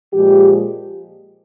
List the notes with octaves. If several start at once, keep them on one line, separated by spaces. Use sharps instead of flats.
A#2 F3 G#3 G4